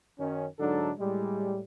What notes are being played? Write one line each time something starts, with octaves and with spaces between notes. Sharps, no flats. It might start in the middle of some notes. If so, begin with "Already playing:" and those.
F#2 D#3 C#4
G#2 D3 F#3 D4 D#4 A4
A2 G3 G#3